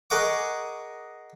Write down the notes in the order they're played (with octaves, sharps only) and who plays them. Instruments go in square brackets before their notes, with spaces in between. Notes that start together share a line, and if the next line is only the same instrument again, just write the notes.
[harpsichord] G#4 A#4 D#5 F#5 C#6 D6